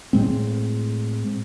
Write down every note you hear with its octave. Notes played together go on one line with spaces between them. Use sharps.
A2 G#3 C4